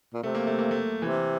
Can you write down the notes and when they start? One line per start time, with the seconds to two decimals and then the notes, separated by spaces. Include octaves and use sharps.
0.14 A#2
0.23 C3 A3
0.35 A#3
0.47 A3
0.59 A#3
0.71 A3
1.02 C3 E3